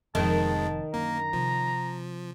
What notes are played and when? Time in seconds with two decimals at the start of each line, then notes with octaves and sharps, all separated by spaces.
0.15 F1 F2 D#3 F3 G#3 A5
0.94 F#2 D3 A#3 A#5
1.33 C3 F3